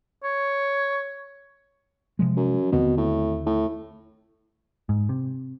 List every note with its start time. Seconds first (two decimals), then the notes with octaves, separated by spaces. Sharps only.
0.24 C#5
2.19 C3 F3 G#3
2.37 F#2
2.72 D#2 B2 D3 C4
2.97 A2
3.46 A2
4.89 G#2
5.09 C3